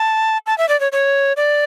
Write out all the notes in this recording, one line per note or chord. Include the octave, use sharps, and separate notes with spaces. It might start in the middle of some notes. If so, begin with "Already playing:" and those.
Already playing: A5
A5
E5
D5
C#5
C#5
D5